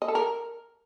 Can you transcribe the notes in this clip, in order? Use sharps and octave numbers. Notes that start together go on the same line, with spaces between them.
D#5
A4
A#4